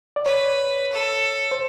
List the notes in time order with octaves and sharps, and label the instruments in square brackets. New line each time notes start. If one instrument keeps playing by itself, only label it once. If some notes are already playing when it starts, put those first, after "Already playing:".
[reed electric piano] D5
[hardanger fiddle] B4 [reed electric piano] C#5
[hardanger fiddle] A4
[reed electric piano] C5